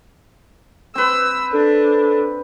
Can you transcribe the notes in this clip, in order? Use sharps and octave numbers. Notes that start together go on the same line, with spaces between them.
C4 B4 E6
D4 A4